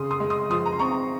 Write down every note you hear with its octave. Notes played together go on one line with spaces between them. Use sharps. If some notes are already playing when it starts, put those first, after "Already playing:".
Already playing: C#3 C6 D#6
C6 D#6
G#3
C6 D#6
F3 C6 D#6
A#5
C6
C4 A#5 C#6